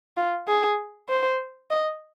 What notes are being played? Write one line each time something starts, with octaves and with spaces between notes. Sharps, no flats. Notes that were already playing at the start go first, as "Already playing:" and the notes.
F4
G#4
C5
D#5